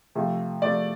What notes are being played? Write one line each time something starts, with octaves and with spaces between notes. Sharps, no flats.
C3 F3 A3
C3 F3 A3 D5